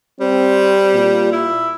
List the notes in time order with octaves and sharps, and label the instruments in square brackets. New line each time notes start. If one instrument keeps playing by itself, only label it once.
[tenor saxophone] G3 [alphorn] C4
[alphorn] A#2
[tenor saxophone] E4